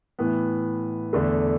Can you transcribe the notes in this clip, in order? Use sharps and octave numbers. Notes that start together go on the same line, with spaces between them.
A2 E3 B3
E2 D3 A3